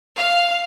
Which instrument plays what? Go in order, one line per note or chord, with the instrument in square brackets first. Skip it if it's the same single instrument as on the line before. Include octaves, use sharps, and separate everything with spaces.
[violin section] F5